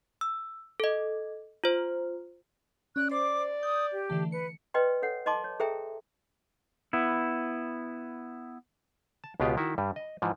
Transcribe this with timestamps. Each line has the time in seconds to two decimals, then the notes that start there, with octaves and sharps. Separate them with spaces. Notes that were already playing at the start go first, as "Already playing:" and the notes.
0.21 E6
0.80 A4 D#5
1.64 F4 C5
2.96 C#4 D5 F#6
3.11 C5 D5 D6
3.63 D#6 G6
3.92 G4
4.09 D3 E3 A3
4.32 B4 C#7
4.74 B4 D5 D#5 G5 C6
5.02 A4 C#5 F#5
5.26 C5 D#5 G#5 A5 C6 D6
5.44 C#5
5.60 G#4 A4 C5 E5 G5 A#5
6.93 B3 E4
9.24 A5
9.40 C#2 B2 G#3 B3 F4 G4
9.57 D#3 E4 F#4 E5
9.78 G2 G3
9.96 D#5
10.22 G#2 E3 F3